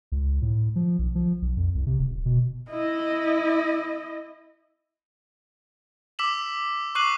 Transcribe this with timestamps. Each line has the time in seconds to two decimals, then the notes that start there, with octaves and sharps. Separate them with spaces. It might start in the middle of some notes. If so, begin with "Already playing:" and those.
0.12 C#2
0.42 A2
0.76 F3
0.99 B1
1.15 F3
1.42 B1
1.57 F2
1.75 C2
1.87 C3
1.99 D#1
2.26 B2
2.70 E4 D#5
6.19 D6 E6 B6 E7 F#7
6.95 C#6 D6 F#6 C7 D#7 F#7